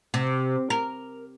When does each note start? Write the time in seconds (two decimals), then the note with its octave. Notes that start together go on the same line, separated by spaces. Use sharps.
0.14 C3
0.70 A#4